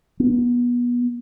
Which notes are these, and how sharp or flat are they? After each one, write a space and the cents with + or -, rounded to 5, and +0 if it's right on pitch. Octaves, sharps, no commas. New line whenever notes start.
B3 -25